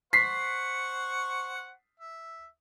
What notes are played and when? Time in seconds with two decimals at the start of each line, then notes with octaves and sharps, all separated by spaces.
0.13 C5 F#5 C#6 B6 C7
2.00 E5